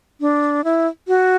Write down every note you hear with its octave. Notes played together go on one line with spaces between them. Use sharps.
D4
E4
F#4